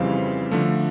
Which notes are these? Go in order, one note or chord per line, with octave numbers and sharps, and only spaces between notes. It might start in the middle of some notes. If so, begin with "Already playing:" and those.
Already playing: F2 C#3 E3 G3 C4 F5
D3 F3 A3